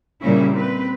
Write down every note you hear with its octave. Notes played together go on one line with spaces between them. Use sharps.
A#2 C#3 G3 A#3 C#4 E4
C4 B4